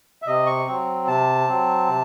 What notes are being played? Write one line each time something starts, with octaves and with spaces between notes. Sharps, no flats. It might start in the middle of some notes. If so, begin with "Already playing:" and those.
E5
C3 D#5
C#6
F#3 C4
C3 A5
F#3 C4
C3